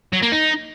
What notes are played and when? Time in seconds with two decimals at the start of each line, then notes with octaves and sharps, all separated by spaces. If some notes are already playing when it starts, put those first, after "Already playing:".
0.12 F#3
0.22 A#3
0.32 D#4